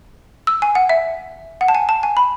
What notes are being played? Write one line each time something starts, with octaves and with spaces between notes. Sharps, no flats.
E6
G#5
F#5
E5
F#5
A5
G#5
A5
G#5
B5